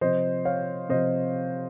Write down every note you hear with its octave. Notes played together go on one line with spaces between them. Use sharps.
C3 F3 C5 D#5
C#5 F5
C3 F3 C5 D#5